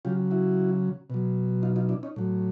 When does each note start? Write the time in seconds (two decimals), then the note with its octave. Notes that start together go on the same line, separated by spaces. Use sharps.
0.05 C#3 F#3 F4 G4
0.31 E4 F#4
1.10 B2 F#3
1.63 D#4 F4
1.76 D#4 F4
1.89 D4 E4
2.03 C#4 D#4
2.16 A2 F#3